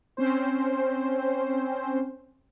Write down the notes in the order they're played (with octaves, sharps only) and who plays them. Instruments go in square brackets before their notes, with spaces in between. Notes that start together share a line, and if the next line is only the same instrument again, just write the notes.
[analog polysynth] C4 C#4 C5